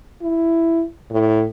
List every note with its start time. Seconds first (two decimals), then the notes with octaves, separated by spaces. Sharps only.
0.22 E4
1.11 A2